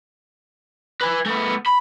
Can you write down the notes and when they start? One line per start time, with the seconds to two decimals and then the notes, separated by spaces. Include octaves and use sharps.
1.01 B4 G#5
1.26 A3 B3
1.66 B5